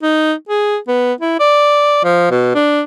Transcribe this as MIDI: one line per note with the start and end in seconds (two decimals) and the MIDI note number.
0.03 0.33 63
0.49 0.77 68
0.88 1.13 59
1.21 1.35 64
1.40 2.00 74
2.04 2.30 53
2.31 2.50 47
2.55 2.82 62